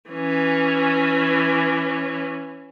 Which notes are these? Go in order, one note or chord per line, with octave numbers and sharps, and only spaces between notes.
E3 C#4